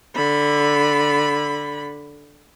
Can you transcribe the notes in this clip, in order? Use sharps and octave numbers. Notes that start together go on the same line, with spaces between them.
D3 B5